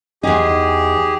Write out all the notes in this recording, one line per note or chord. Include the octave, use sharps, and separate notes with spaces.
E2 G2 D#4 G4 G#4